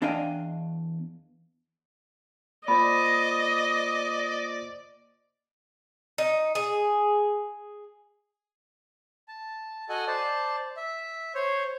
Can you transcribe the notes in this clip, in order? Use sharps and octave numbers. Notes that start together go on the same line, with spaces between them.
E2 D4 D#5 F5 G5 G#5
A#3 F4 C5 D5 D#5 B5
D#4
G#4
A5
F#4 A4 D#5 F#5 G#5
C5 D5 A5
E5
C5 C#5